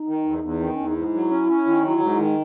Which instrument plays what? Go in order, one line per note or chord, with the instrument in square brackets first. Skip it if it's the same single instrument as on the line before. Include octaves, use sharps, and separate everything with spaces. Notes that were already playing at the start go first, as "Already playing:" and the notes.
Already playing: [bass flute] D#4
[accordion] D#3
E2
E2
[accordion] D#3 [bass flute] B3
[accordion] E2 [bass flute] C#4
[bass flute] D#4
[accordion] G#2 [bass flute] E4
[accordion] F#3
C#4
C#4
D#3
F#3
G#2
D#3